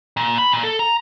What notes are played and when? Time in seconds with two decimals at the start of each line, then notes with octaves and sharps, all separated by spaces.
0.17 A#2
0.38 B5
0.52 A#2
0.63 A4
0.79 A#5